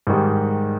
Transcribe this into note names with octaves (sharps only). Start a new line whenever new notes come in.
G#2 D#3 G3